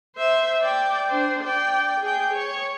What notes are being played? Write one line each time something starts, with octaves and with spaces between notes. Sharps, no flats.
C5 E5
D5 G5
D4 C5
D5 G5
G#4 G5
C#5